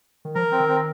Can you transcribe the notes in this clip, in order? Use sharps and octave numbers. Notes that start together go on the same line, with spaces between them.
D#3
F3 A#4
C4
D#3
C4